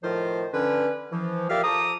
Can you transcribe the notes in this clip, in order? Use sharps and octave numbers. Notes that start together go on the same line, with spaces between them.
A2 D#3 F3 F4 A#4 C5
D3 C#4 B4
E3 F3
F4 G4 A#4 D5 E5 F5
F3 A4 A#5 D6 D#6